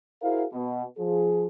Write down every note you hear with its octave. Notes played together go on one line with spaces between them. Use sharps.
E4 F#4 G#4 A#4 C5 F5
B2
F3 G#4